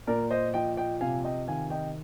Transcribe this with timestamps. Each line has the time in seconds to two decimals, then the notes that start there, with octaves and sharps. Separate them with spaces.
0.07 A#2 A#4 D5
0.30 C5 D#5
0.54 F3 D#5 G5
0.77 D#5 G5
1.01 C3 F5 G#5
1.24 D#5 G5
1.48 D#3 F5 G#5
1.70 D#5 G5